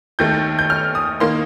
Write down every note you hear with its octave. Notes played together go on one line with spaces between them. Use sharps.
D#2 D#3 A3 G6
G6
F6
D#6
D#3 A#3 C6